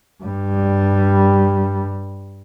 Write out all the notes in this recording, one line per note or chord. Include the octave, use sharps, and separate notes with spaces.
G2 G3